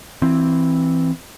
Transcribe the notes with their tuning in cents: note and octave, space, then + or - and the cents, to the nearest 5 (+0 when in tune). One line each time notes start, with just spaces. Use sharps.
E3 +0 C4 +5